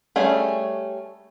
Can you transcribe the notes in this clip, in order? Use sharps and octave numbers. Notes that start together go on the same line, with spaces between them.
G3 A3 C#4 G#4